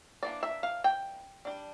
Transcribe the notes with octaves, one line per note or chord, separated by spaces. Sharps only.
E3 A#3 D4 D5
E5
F5
G5
G3 D4